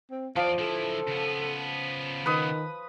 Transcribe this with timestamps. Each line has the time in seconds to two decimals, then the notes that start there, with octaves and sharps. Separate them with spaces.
0.11 C4
0.36 E2 F3 D5 F5
0.59 D3 E4 A4
1.07 C#3 B3
2.26 D#3 B4 D#6